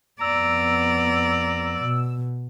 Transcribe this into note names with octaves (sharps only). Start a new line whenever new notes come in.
F2 B3 D5 A#5 E6
B2